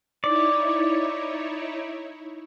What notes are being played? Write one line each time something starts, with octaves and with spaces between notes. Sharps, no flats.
D#4 E4 C#5 D5